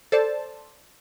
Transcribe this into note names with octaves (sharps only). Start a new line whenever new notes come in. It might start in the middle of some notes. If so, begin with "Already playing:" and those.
A4 C5 D5 A5